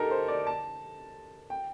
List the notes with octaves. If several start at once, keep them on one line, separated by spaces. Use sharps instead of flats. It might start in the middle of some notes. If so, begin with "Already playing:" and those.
Already playing: D#4 G4 A4 A#4
C5
D5
A5
G5